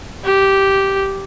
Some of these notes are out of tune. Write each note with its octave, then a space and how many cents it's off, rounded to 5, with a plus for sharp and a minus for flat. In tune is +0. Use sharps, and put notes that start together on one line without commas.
G4 -10